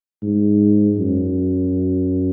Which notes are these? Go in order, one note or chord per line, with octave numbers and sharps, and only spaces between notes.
G#2
F#2